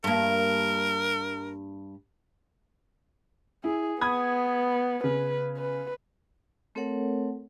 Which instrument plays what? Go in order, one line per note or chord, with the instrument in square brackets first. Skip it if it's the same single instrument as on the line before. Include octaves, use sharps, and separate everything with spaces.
[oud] G2 A#3 [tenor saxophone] A#4
[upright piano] E4 [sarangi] G#4
[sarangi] B3 [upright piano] B5 D#6 G#6
[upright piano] C#3 [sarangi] B4
[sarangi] B4
[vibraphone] A3 C4 A4 A#4 C#5 F#5